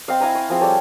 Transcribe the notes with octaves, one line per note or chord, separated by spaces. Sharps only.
C4 D#5 F5
E4 F5 G#5 A#5
C#6
F3 C4 G#4
G3 A4 C#5 F5